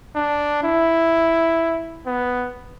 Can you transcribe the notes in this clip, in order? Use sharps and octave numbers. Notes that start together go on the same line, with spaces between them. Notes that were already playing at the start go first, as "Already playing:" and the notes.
D4
E4
B3